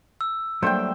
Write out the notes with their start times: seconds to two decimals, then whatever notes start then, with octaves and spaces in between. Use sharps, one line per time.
0.21 E6
0.62 F#3 G3 A3 A#3 D4 C5 G5